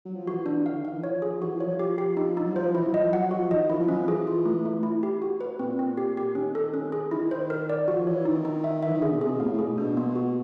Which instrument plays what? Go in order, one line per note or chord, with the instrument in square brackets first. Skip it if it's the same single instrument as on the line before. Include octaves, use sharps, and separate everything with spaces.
[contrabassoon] F#3
F3
[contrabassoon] E3 [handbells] F#4
[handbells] D4
[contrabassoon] D3 [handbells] F5
[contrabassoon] D#3 [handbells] F5
[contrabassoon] E3
[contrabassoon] F3 [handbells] C#5
[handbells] G#4
[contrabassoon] E3 [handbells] F#4
[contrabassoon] F3
[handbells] C#5
[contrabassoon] F3
[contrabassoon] F3 [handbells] G4
[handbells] G4
D#4
D#4
[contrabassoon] F#3
[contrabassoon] F3 [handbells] C5
[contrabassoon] E3 [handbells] E4
[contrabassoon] F#3
[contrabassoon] F3 [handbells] D#5
[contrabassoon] F#3 [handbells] F#5
[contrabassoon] F3 [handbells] F#4
[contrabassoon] D#3 [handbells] D#5
[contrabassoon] F3 [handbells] E4
[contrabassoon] F3
[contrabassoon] F#3 [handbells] C#4
[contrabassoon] F3
[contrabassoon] E3 [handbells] G#4
[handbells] F4
A3
A3
E4
G4
F#4
B4
[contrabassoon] A#2 [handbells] C4
[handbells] C4
G4
G4
[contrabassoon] D#3 [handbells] C#4
[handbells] A4
C#4
G#4
[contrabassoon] D#3 [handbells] E4
[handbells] C5
A#4
D5
[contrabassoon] F3 [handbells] F#4
[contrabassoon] E3 [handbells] C#5
[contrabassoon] D#3 [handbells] D#4
[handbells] D#4
E5
[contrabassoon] E3 [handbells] E5
[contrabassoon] D#3
[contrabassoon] D3 [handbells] G#4
[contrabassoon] B2
[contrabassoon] C3 [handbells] G#4
[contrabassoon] B2
[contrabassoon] A2 [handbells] F5
[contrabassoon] A2
[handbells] G#4
[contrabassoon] B2
[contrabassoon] B2 [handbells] D4
[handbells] A#3
F#4